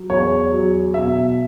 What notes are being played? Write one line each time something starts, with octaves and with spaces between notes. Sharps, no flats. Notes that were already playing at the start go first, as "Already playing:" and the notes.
Already playing: F#3
E2 C#5
F#3
B2 E5